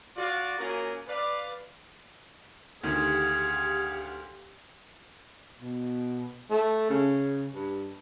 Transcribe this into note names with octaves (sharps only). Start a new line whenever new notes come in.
F4 F#4 D5
A#3 C#4 F4 F#4 G#4 A#4
B4 D5 F5
D2 D#3 G4 G#4 F5 F#5 F6
B2
A3
C#3
G2